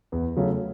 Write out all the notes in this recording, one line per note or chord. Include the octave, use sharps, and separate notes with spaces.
E2
C#3 F#3 A3 C#4